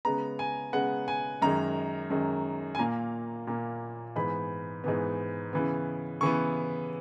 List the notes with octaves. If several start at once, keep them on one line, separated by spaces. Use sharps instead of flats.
C#3 G#3 B3 A#5
G#5
C#3 G#3 B3 F#5
G#5
F#2 D#3 G#3 A#5
F#2 D#3 G#3
G#5
A#2 A#3 A#5
A#2 A#3
G#2 E3 B3 B5
G#2 E3 B3
C#3 E3 B3
C#3 E3 B3 C#6